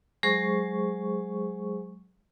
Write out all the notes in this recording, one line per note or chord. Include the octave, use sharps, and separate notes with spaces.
F#3 G#3 G#4 C5 C#6